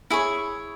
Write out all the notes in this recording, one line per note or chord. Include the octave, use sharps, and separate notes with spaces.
E4 G#4 C#5